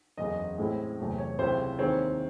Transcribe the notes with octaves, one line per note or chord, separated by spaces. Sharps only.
F#1 E2 C#3 D#5
A2 G#3 C4 E4
E2 C3 F#3 A3
C#5
C#2 C3 F#3 C#4 E4 C5
D#2 D#3 G#3 C4 E4 C#5